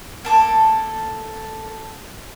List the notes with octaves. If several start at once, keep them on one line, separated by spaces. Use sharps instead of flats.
A#3 A4 D6